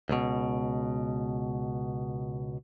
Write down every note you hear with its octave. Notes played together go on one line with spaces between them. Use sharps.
C#2 B2